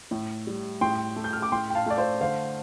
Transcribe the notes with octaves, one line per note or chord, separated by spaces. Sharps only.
A2
G3
A2 G5 C6
A3
G6
F6
D6
A2 G5 C6
G5
F5 A5
A3 D5
C5 F5
D3 C5 F5